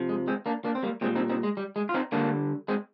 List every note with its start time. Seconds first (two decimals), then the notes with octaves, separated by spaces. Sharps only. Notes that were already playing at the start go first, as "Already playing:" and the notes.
Already playing: C3 F3
0.09 G#3
0.27 G#3 C4
0.46 A#3 D4
0.64 A#3 D4
0.75 C4
0.83 G3 A#3
1.01 A#2 G#3 C4
1.05 G3
1.15 C4 D#4
1.29 C4 D#4
1.43 G#3
1.57 G3
1.76 G#3
1.89 F4
1.94 C4 D#4
2.12 D3 G3 A#3 D4
2.68 G#3 C4